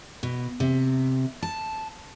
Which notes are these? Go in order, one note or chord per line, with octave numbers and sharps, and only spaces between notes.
B2
C3
A5